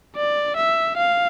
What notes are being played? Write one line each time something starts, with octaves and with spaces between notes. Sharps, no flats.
D5
E5
F5